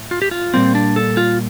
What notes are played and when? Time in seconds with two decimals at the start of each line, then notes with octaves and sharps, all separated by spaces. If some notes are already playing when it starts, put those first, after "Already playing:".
Already playing: A2 A3
0.11 F4
0.22 G4
0.31 F4
0.54 A#2 G3 A#3 C4
0.75 D4
0.96 A4
1.17 F4